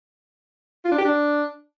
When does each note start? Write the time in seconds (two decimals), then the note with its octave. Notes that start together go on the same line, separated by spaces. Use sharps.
0.85 F4
0.92 D4
0.98 G4
1.05 D4